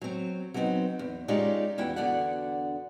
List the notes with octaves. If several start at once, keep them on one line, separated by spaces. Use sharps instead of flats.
F#3 C4
F#3 G3 B3 C4 D#4
E2
G#3 C#4 D#4 F4 G4 D5
E2 E4 F#4 G5
E2 D3 B3 F#4 D5 F#5